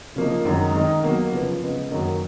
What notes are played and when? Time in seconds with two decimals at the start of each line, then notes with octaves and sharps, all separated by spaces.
0.16 C#3 F3 A#3 D#4
0.45 F#2 D#3 G#3 D#4
0.74 D#3 G#3 D#4
1.03 B2 F#3 A#3
1.32 C#3 F3 B3
1.61 C#3 G#3 B3
1.90 F#2 D#3 F#3 A#3 D#4